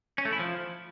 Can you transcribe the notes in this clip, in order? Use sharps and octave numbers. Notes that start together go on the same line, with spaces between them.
C#4
A3
E4
F3